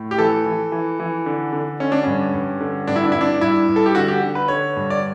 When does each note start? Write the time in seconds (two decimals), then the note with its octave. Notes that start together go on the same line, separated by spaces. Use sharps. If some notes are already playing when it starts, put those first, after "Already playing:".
Already playing: A2
0.11 G4
0.18 E3 A4
0.46 E3
0.72 E3
1.00 E3
1.26 D3
1.53 D3
1.80 D3 C#4
1.92 D4
2.03 G2 C#4
2.34 G2
2.61 D3
2.87 G2 D4
2.96 E4
3.04 D4
3.12 G2 E4
3.21 D4
3.41 G2 E4
3.69 G2
3.76 A4
3.86 G4
3.95 D3 F#4
4.08 G4
4.22 D3
4.35 B4
4.48 D3 C#5
4.76 G2
4.90 D5